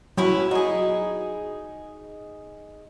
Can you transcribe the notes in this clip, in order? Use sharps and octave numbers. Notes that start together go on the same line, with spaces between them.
F#3 C#4 E4 B4
D#4 F#4 G#4